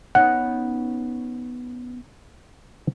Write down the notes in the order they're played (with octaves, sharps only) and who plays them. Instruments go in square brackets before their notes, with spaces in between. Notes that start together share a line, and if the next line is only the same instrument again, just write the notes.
[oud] B3 C#4 D#4 [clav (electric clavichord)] F#5